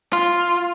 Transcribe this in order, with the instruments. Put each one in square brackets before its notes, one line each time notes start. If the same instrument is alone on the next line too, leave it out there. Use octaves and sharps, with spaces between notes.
[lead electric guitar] F4